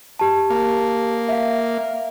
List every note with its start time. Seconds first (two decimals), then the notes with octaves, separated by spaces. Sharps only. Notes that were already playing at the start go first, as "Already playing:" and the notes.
0.19 G4 A5
0.50 A#3
1.29 E5 F5